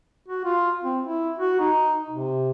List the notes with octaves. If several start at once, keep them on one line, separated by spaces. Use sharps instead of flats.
F#4
F4
C4
E4
F#4
D#4
C3